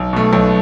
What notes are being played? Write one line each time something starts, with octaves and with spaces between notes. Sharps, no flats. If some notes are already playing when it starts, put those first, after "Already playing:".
Already playing: B1
B2 A3
B1